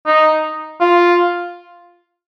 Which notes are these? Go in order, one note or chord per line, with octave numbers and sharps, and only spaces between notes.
D#4
F4